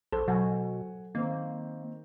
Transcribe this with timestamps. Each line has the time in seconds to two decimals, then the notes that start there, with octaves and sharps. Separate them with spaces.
0.12 A#1 A4 C5
0.28 B2 F#3 F#5 G#5
1.15 D#3 A#3 C4